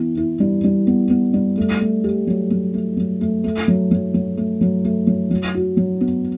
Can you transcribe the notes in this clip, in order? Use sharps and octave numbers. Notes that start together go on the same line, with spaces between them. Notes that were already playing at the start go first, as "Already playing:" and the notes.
Already playing: E3 B3
E4
G3
G3
B3
B3
G3
A3
A3
G4
F#3
F#3
A3
F#3
A3
A3
F#3
F#3
F#3
A3
F#3
A3
F#3
F#3
F#4
F#3
B3